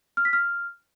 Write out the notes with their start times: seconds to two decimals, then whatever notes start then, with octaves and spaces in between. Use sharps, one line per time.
0.17 F6
0.25 B6
0.33 F6